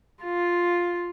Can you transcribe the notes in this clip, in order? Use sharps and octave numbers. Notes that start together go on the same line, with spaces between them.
F4